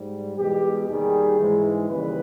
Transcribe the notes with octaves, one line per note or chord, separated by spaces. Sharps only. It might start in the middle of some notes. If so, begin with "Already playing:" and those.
Already playing: G#2 G3
E2 B2 G#3 G4
D#2 D#3 G3 G#4
G#2 E3 G#3
D#2 C#3 E3 G3 B4